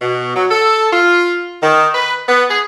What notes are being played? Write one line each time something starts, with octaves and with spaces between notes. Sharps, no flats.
B2
F#3
A4
F4
D#3
B4
B3
G#4